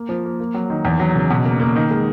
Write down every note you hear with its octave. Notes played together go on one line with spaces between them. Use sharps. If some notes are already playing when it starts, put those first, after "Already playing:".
Already playing: A#3
F3
A#3
A#3
F#3
D#3
E2
F#3
C#3
B2
A#3
A#3
D#3
G#3